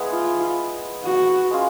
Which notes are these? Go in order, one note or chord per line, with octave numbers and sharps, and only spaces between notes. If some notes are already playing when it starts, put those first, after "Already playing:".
Already playing: G#3 B3 E4
F4
F#4
G#3 C#4 F4